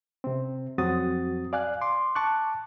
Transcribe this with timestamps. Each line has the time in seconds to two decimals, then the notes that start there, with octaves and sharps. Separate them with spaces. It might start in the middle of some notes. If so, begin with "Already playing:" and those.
0.24 C3 C4
0.78 F2 F#3 C4 F#4 D#6 A6
1.53 D5 F5 G#5 F#6
1.81 C6 D6
2.15 A5 C#6 D6 F#6